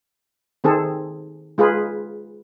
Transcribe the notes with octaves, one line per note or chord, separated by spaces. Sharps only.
D#3 C4 G#4 A4
G#3 F4 G#4 B4